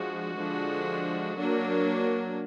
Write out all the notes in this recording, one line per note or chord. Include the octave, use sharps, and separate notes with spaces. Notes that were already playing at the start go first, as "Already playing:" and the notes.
Already playing: F3 G#3 D4 F#4
D3 F3 G#3 D4
F#3 A#3 D4